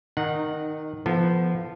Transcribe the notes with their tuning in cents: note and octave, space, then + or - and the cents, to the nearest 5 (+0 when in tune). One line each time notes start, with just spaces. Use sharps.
D#3 +0 D#4 -25 F#5 -5
F3 -20 B3 +0 A4 +0